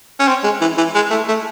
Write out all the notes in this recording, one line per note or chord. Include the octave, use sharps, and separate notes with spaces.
C#4
C4
G#3
E3
E3
G#3
A3
A3